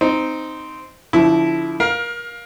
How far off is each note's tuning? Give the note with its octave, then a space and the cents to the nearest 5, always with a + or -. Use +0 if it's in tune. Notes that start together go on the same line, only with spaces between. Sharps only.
C4 -10 D#4 +0
D3 -45 F3 -5 E4 +0
A#4 +25 F5 +10